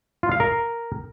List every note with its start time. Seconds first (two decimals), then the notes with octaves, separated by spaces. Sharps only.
0.23 F4
0.32 F5
0.40 A#4